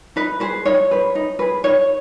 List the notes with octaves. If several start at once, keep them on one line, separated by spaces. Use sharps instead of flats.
D#4 B4
G#4 B4 C5
D#4 C#5
G#4 B4
D#4
G#4 B4
D#4 C#5